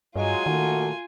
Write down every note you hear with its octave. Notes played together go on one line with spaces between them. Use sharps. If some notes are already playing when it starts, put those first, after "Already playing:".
G2 F#3 G#3 F4 G#5
A#2 D#3 A3 F#4